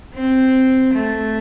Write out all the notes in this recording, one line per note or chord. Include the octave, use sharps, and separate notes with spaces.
C4
A3